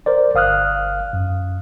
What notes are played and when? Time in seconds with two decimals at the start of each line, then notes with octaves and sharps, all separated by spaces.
0.06 A#4 C5 D5
0.35 G1 F5 D#6 F6 F#6
1.13 F#2